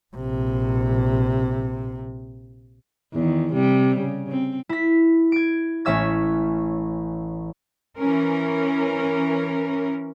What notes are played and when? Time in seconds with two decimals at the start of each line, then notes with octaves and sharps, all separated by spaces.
0.16 A#1 C3
3.13 E2 D#3
3.53 C3 G3
4.00 C#3
4.30 C4
4.69 E4 B6
5.32 G#6 D7
5.85 A1 C#4 E5 E6 G#6
7.99 E3 C#4 A#4